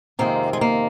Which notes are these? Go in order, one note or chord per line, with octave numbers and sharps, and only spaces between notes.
F2 C3 D#3 G#3 A#3
G#3
A#3